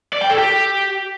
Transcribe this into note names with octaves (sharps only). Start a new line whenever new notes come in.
D5
G5
A4
G4